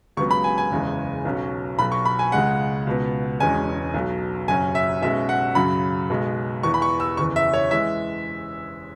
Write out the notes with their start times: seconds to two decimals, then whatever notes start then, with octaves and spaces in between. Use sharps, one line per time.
0.17 C#2 C#3 F#3 B3 C#6
0.31 B5
0.44 G#5
0.58 G#5
0.71 F#1 E2 C#3 G#3
1.25 B1 B2 F#3 C#4
1.79 B1 B2 F#3 B5
1.92 C#6
2.05 B5
2.19 G#5
2.32 C#2 C#3 G#3 F#5
2.87 C#2 B2 B3
3.40 E1 E2 B2 G#3 C#4 G#5
3.94 B1 B2 F#3
4.48 F#1 F#2 F#3 C#4 G#5
4.75 E5
5.02 B1 B2 G#3 C#4 E5
5.29 F#5
5.55 F#2 C#3 F#3 B5
6.10 B1 B2 G#3
6.63 E2 E3 B3 C#6
6.74 B5
6.82 C#6
7.00 E6
7.17 F#1 E2 E3 C#6
7.36 E5
7.53 C#5
7.71 E3 G#3 E5